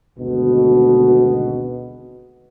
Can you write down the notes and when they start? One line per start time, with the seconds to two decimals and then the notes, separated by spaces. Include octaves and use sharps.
0.19 G#1 D2 B2